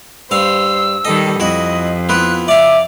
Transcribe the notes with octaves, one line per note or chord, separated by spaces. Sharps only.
G2 C5 F5 E6
D#3 G3 A4 D#5
F2 E4 F#4 D#5
B3 E4 F4 F#6
D5 E5 F5 D6